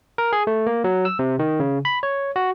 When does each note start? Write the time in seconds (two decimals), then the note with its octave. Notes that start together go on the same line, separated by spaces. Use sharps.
0.18 A#4
0.33 G#4
0.47 A3
0.67 A#3
0.84 F#3
1.05 E6
1.19 C3
1.39 D#3
1.60 C#3
1.85 B5
2.03 C#5
2.36 F#4